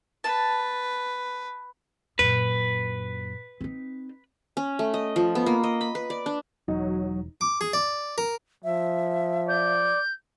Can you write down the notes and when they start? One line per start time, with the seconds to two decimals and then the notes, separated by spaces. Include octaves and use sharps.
0.24 B4 A5
2.19 F#2 A#2 B4
3.60 C4 D#4
4.57 C#4
4.79 A3
4.94 D#5
5.16 F3
5.35 B3
5.46 A#3
5.64 D#5
5.81 B5
5.95 B4
6.10 D5
6.26 D4
6.68 E1 F#3 D#4
7.41 D6
7.61 G#4
7.73 D5
8.18 A#4
8.64 F3 E5
9.48 D5 G6